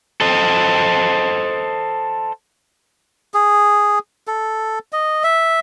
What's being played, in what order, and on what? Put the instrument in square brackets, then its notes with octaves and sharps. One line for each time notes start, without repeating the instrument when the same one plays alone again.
[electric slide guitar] A4 C5 D#5
[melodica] G#4
A4
D#5
E5